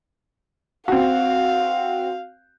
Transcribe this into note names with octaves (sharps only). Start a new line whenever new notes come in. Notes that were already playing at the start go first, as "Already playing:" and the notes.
C4 F#4 F5